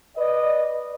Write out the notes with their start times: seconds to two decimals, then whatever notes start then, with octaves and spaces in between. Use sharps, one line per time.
0.17 B4 D5 D#5